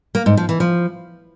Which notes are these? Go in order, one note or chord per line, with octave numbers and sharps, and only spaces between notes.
A#3
G#2
F3
E3
F3